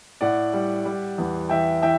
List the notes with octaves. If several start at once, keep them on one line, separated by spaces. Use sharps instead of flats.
A2 D5 F#5
G3
G3
E2
E3 E5 G5
E3 E5 G5